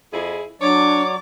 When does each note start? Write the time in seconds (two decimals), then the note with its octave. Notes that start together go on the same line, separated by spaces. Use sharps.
0.12 F2 E4 G#4
0.61 F#3 D4 C#5 D5 D6